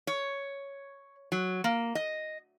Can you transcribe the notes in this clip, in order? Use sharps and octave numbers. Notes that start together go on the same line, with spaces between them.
C#5
F#3
A#3
D#5